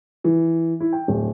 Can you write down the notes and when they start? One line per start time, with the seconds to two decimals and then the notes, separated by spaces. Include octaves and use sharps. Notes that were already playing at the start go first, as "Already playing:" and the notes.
0.24 E3
0.80 E4
0.93 G5
1.08 D1